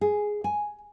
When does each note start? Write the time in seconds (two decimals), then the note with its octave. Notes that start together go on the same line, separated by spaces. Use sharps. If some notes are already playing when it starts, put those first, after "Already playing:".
0.01 G#4
0.44 G#5